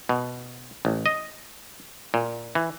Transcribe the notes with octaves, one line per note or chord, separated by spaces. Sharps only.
B2
A1
D#5
A#2
E3